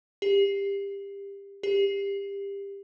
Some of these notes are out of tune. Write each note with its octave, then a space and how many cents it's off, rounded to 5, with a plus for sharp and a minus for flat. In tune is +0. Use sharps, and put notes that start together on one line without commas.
G4 +25
G4 +25